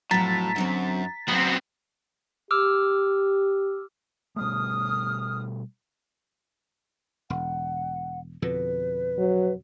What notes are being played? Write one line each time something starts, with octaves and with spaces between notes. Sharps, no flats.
F2 A2 F#3 A#5 A6 B6
F#2 D3 F#3 C4
F#3 B3 C4 F#4 C5
G4 D6 E6 F6
B2 G3 A3 D#6 F6
E1 F#5
F2 B2 D3 B4
F#3